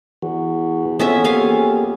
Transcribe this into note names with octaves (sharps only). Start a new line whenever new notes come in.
E2 E3 F#4
F2 E3 B3 C#4 C#5 E5
A#3 C#4 G4 G#4 F5 G#5